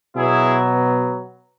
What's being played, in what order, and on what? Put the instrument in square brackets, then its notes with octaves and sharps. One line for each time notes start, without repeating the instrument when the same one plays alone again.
[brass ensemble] B2 F#3 B3 E4 G#4